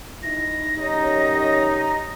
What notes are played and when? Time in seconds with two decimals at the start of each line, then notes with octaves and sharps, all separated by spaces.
0.23 D#4 E4 A#6
0.78 F#2 D#4 G4 C#5